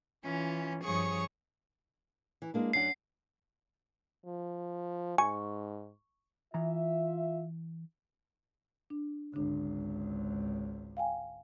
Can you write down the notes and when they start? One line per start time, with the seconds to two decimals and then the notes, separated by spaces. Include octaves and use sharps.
0.24 E3 C#4 F4
0.85 G2 F3 G#4 C#5 C#6 D#6
2.42 E3
2.54 G#3 A#3 D4
2.73 F#2 D4 F#5 C7
4.25 F3
5.18 G#2 G#5 C#6
6.54 E3 F4 E5 A#5
8.90 D4
9.34 G#1 C#2 D3 D4
10.97 F5 G5 G#5